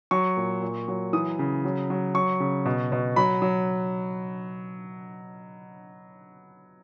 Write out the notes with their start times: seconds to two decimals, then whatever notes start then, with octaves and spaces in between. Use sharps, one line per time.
0.11 F#3 C#6
0.37 A#2
0.62 A#2
0.88 F#3
1.13 E3 D#6
1.39 C#3
1.65 F#3
1.90 F#3
2.14 F#3 C#6
2.40 C#3
2.65 B2
2.92 B2
3.16 F#3 B5
3.42 F#3